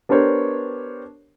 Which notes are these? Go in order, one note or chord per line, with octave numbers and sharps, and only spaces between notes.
B3 D4 G4 A#4 C5 C#5